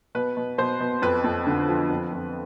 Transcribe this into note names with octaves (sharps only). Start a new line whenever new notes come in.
B2 B4
B2
B2 C5
B2
F2 B4
F2
D3
F3
F2
F2